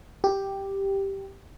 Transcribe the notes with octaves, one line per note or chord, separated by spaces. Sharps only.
G4